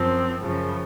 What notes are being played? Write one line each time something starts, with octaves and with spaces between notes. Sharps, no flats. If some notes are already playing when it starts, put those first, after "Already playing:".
Already playing: F#2 F3 C4
F#2 C#3 F3